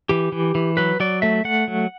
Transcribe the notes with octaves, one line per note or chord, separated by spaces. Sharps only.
E3 G4
E3
E3
F#3 B4
F#3 D5
A3 E5
A3 F#5
F#3